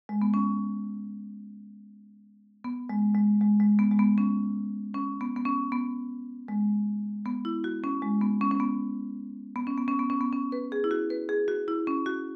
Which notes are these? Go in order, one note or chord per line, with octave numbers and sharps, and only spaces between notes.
G#3
B3
C#4
B3
G#3
G#3
G#3
G#3
B3
G#3
B3
C#4
C#4
B3
B3
C#4
B3
G#3
B3
E4
F#4
C#4
G#3
B3
C#4
C#4
B3
B3
C#4
B3
C#4
B3
C#4
B3
C#4
B4
G#4
E4
F#4
B4
G#4
F#4
E4
C#4
F#4